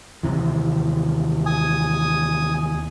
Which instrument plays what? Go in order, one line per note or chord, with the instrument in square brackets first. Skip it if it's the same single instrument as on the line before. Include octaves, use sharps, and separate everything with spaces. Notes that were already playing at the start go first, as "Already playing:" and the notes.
[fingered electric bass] D#2 C3 E3
[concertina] G#5 D#6